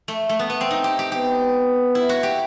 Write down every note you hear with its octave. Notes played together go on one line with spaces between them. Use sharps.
A3
A3
B3
B3
C4
D#4
G4
G4
B3 G4
E4
F#4
G4